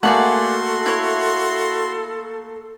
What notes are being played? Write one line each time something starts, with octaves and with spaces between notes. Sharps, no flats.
A3 A#3 F#4 G#4 A4 D5 F#5 C6
E4 C#5